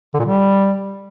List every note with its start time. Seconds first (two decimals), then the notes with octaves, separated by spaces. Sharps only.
0.14 D3
0.19 A#2
0.25 G3